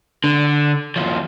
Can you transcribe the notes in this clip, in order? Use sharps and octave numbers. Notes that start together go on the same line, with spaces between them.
D3
D#2 F3